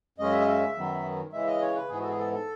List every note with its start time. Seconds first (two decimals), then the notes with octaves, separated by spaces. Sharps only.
0.18 F#2 C#3 G#3 C#4 D#5
0.32 E5
0.40 D#5
0.47 E5
0.75 F#2 D#3 F#3 B3
1.33 C#3 E3 G#3 E5
1.47 D#5
1.61 C#5
1.76 B4
1.89 G#2 E3 B3 G#4
1.99 F#4 A4
2.09 G#4
2.17 A4
2.33 A4